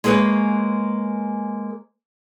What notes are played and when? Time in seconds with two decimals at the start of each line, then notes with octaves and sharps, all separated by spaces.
0.04 G#3 A#3 G#4 B4 C#5